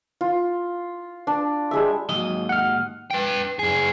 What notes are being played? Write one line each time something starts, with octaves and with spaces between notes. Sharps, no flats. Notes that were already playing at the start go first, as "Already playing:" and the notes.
F4
D4
G3 G#3 E5
D#2 G#2 F#3 D#5
F#5 F6
B4 G5
F#2 G#4